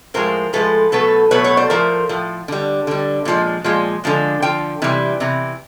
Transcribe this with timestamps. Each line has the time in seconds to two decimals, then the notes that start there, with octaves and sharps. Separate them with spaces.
0.14 A2 F3 G#3 A#4 C5
0.53 A2 F3 G#3 A4 B4
0.92 B2 F#3 A3 A4 B4
1.31 B2 F#3 A3 B4 C#5
1.44 B4 C#5
1.57 C5 D5
1.70 A2 F3 A3 A#4 C5
2.09 A2 F3
2.48 D3 G3
2.87 D3 G3
3.25 A#2 F3 G#3
3.64 A#2 F3 G#3
4.04 D3 F3 G#3
4.42 D3 F3 G5
4.82 C3 E3 G3
5.20 C3 E3